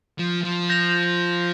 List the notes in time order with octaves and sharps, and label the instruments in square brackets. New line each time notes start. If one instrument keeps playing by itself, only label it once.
[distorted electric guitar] F3
F3
[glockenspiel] G6 A#6 F7